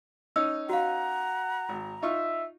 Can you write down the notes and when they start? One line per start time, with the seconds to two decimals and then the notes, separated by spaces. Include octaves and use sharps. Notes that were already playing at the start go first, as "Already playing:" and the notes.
0.36 C#4 D#4 E6
0.69 F#4 F5 F#5 A#5
1.69 G#1
2.02 D#4 F4 E5 C#6